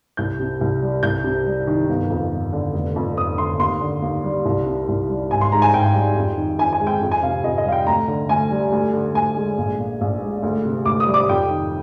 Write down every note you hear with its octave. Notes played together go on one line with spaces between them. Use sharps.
C2 G6
C3
C2
G3
C2 G6
C3
G3
D#3
G1
F2
G1
D3
F1
F2
F1 D#6
D3 C6
D#2 C6
D3
D#2
G3
C2
C3
C2
G3
G#1 G#5
C6
G#2 A#5
G#5
G#1 G5
G3
F2
D#3
F2 G#5
G#5
G#3
G5
F2
G#5
C3 F5
F2 D#5
D#5
G3 F5
G5
D2 A#5
D3
D2 G#5
G3
D2
D3
D2 G#5
G#3
A#1
A#2
A#1
G#3
D2
C3
D2 D6
D#6
G3
D6
F2 G5
D#3